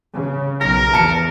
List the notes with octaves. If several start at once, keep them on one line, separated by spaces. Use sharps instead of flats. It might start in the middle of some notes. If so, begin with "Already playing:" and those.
C#3
B1 A#4 A#6
E2 A5 C#7